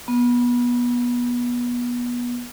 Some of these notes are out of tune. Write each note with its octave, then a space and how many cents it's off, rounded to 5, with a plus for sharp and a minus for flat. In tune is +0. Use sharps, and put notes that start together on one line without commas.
B3 -25